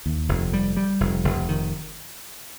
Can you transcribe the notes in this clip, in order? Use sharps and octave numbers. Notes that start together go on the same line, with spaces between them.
D#2
F1
G3
G3
F1
F1
D#3